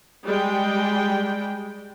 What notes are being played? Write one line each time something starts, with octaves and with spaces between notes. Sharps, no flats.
G3 G#3 G5